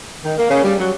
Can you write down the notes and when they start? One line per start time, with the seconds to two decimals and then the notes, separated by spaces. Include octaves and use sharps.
0.24 D#3
0.38 A#3
0.50 C#3
0.63 G3
0.79 F#3